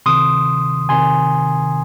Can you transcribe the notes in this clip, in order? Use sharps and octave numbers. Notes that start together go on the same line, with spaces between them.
C3 D#3 C6 D#6
C3 D#3 G#5 C6